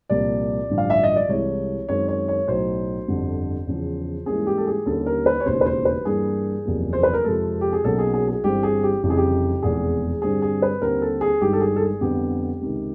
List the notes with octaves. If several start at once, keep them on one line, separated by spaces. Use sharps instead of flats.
C2 A#2 F3 D5
A1 G2 D3 F3
F5
E5
D#5
D5
C2 C3 E3 G#3 C#5
F#2 D#3 G#3 C4 C#5
C#5
C#5
B1 A2 F#3 C5
G1 F2 D3 G3
E2 C#3 F3
G#2 E3 G3 A#3 C#4 G#4
G4
A4
G#4
D#2 D3 G3 A#3 C#4 A4
A#4
B4
C#5
E1 D#2 C#3 C5
B4
C5
B4
G2 E3 G3 A#3 G#4
F#1 E2 C3 F3 A#3
C5
B4
A#4
F2 C3 F3 G#3 A4
G4
G#4
B1 B2 F#3 A#3 C#4 A4
G#4
G#4
G#4
G1 G2 E3 G3 C4 G4
G#4
G4
F1 F2 C#3 E3 G3 G4
G#4
G4
F1 E2 B2 G#3 G#4
G2 D3 G3 C4 G#4
G#4
B4
D#2 D3 G3 C4 A#4
A4
G#4
G1 G2 D#3 G#3 G4
A4
G#4
A4
G#4
F2 D3 G3 B3 D4 G4
C#2 C3 D#3